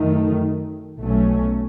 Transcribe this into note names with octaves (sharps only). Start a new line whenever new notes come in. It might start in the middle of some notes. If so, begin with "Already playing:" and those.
Already playing: F#2 D#3 A3
B1 B2 F#3 A3 C#4